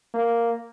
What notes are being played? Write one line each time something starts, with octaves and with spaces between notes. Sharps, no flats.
A#3